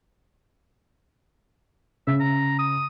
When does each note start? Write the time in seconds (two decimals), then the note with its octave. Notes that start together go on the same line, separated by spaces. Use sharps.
2.07 C#3 E5
2.20 A#5
2.58 D#6